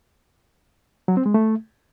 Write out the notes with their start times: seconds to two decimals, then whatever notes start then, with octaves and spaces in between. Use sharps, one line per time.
1.08 F#3
1.17 C4
1.26 G#3
1.34 A3